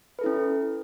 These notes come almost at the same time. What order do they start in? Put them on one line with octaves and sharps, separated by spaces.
B4 A4 E4 C#4